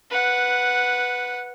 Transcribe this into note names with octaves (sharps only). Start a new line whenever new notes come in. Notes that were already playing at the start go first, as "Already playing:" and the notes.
B4 F#5